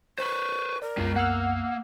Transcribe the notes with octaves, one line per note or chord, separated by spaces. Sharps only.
B4 C5 C#6
A#4 D5
C2 F#2 G#3 B3 F4
A#3 F#5 E6 F6